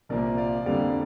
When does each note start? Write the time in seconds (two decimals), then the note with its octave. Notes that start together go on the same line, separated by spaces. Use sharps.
0.09 C2 A#2 F3 A#3 A#4 D5
0.37 D5 F5
0.65 F2 D3 G3 A#3 D5 F5